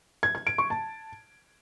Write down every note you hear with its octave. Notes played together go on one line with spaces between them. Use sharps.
G#6
G#6
D7
C#6
A5